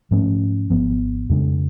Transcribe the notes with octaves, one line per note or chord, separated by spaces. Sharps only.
G#2 F3 A3 C#4
G#1 G#2 F3 B3
F2 C#3 G#3 D4